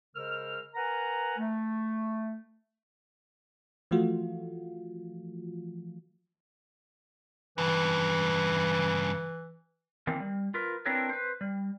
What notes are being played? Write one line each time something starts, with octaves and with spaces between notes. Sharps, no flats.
C#3 G#3 A#4 C5 E6 F6
A#4 B4 F#5 G#5 A#5
A3
E3 F3 A3 F4 F#4
G2 C#3 E3
D#3 E3 A#3 C4
G3
F4 A#4 B4
C4 D4 E4 A#4 B4 C#5
B4 C5
G3